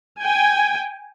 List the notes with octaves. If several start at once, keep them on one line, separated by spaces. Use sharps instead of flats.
G5 G#5